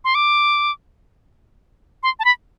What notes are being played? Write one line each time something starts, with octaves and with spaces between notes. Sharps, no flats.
C6
D6
C6
A5
B5